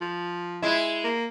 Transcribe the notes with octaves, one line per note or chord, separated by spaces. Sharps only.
F3
G#3 E4
A#3